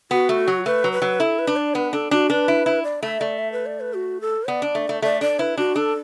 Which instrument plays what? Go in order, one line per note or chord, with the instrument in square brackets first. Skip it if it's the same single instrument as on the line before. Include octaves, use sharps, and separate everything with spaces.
[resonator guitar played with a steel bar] B3 [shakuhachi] F#4
[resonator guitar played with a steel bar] A3
F#3
[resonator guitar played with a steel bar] A3 [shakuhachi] B4
[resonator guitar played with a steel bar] F#3
[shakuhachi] B4
[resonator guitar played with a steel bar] F#3
[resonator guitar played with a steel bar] E4 [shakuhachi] A4
[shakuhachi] B4
[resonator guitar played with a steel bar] D4
[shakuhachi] D5
[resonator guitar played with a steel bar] B3 [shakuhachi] B4
[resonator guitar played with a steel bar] D4 [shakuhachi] A4
[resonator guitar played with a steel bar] D4 [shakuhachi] F#4
[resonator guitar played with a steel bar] D4 [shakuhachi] B4
[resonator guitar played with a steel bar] E4
E4
[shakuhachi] D5
[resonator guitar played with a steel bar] A3 [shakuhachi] E5
[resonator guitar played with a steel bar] A3 [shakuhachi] D5
[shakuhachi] E5
B4
D5
B4
F#4
A4
[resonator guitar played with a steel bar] B3 [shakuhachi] D5
[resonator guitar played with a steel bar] D4
A3
A3
[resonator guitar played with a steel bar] A3 [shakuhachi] D5
[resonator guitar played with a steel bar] D4 [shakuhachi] D5
[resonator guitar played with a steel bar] E4 [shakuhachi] B4
[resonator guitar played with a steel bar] D4 [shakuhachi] F#4
[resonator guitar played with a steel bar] D4 [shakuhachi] A4